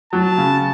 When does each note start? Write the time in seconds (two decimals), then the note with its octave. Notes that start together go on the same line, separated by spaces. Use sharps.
0.13 F#3 A5
0.37 C#3